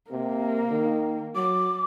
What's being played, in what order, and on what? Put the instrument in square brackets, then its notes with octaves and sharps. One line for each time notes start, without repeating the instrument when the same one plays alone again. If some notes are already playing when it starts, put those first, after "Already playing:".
[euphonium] C3 [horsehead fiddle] A#3
[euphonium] D#3
[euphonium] F#3 [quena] D6